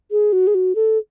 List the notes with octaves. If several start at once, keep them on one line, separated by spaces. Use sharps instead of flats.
G#4
F#4
G#4
F#4
A4